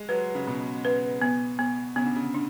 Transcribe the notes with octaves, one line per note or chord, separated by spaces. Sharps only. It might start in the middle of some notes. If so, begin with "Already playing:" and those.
Already playing: G#3
F#3 B4
C#3
B2 C#4
B4
B3
B3
C#3 B3
D3
C#3
D4